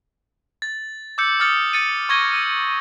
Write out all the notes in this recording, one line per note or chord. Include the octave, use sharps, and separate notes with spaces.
A6
D6 E6 G6 C#7
D#6 F6 A6 C#7
A6 C#7 D#7
C#6 G#6 A#6 G7
E6